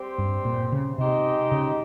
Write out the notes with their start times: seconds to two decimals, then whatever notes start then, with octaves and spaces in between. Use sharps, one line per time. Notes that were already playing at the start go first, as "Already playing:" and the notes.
Already playing: G3 C4 G4 C5
0.18 G2
0.45 A#2
0.72 C#3
0.98 C3 G#3 D#4 G4 C5 D#5
1.51 C#3